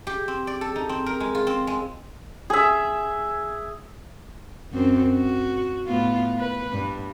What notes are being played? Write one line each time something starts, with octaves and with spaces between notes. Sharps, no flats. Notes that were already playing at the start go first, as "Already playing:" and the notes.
G4
C4
D5
A4
D#4
C4
A#4
G#3
F4
C4
G#3
G#4 E5
F#2 C4
F#4
A2 B3 F4
B4
G2